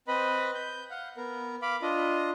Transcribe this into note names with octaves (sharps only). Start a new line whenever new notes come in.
C4 B4 D#5 B5
G6
F5 F#5
B3 A#4
F5 B5 D6
D4 F4 D#5